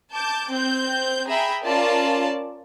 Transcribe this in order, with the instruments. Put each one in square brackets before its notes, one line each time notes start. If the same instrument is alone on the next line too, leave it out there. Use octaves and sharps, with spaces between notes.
[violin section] A5 D6 G6
C4 G6
G#4 E5 G5 A#5 B5
C#4 F4 A#4 D5 A5